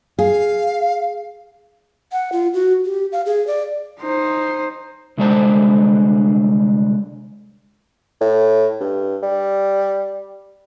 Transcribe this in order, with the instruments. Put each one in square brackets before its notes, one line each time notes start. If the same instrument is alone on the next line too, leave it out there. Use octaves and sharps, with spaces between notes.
[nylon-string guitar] G#4 [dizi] F5
[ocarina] F#5
F4
F#4
G4
F5
G#4
D5
[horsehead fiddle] D#4 C5
[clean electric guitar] C2 D3 G#3 D4 C5 A5
[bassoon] A2
G2
G3